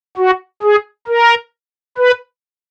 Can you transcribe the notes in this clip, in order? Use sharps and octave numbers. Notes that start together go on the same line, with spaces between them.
F#4
G#4
A#4
B4